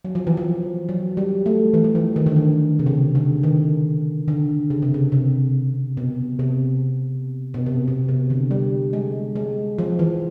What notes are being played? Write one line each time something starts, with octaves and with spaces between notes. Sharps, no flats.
F#3
F3
E3
F3
F#3
G3
A3
E3
F3
E3
D#3
D3
D#3
C3
C#3
D3
D#3
D3
C#3
C3
C#3
C3
B2
C3
B2
C3
B2
C3
D3
G3
G#3
G#3
F3
E3